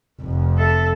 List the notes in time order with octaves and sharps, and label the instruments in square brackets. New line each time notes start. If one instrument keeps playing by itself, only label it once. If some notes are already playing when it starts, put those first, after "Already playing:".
[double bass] F1 F2
[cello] A4 E5